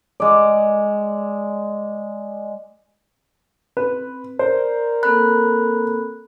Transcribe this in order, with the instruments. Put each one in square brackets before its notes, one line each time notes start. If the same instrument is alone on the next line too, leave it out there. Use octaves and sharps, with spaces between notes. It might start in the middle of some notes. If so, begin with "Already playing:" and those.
[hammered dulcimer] G#3 D5
[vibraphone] C4 [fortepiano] B4
[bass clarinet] A#4 [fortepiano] C5 [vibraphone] D5
[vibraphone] A#3 C4 A4 [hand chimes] B5 F#6